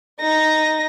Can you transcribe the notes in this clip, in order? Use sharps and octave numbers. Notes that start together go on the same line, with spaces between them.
D#4 A#6